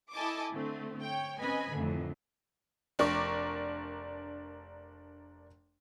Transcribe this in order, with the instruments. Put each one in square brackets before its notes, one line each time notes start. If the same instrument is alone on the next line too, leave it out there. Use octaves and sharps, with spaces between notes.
[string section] E4 A4 D#5 G#5 A5 D6
D3 A3 C4
C#5 G5
C4 C#4 B4 D#5 G#5 B5
F2 A2 D3 D#3
[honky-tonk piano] F1 D4 A#4 C#6 D6